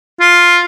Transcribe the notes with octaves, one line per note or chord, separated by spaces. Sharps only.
F4